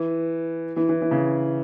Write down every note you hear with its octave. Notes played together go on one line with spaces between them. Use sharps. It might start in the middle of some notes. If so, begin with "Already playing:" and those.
Already playing: E3
E3
E3
E3
C#3